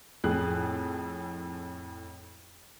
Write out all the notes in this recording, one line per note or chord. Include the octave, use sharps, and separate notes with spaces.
F2 A2 G#4 F#6